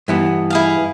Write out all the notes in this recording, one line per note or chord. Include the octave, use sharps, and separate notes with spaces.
G2 E3 B3
E4 G#4 F5